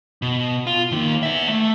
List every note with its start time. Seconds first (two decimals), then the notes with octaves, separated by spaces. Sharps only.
0.22 B2
0.67 F4
0.92 D#3 A#3
1.23 B3 E5
1.48 A3